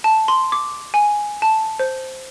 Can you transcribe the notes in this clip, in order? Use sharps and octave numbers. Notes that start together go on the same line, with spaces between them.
A5
C6
D6
G#5
A5
C5